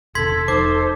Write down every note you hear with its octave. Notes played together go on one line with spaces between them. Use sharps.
E1 C3 D#3 A4 C6 G#6 B6
E1 F3 D#4 A4 C5 D6